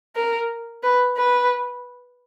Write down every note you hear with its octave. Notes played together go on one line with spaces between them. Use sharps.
A#4
B4
B4